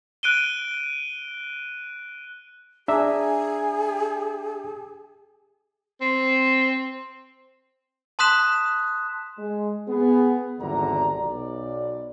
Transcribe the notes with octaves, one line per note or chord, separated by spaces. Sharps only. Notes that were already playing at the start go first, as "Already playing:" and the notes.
F#6 D7 D#7 G7
D4 G#4 E5 A#5
C4
A5 C6 D#6 F#6 B6 E7
G#3
B3 G#4
G#1 E2 D3 G3 A#5
B1 D5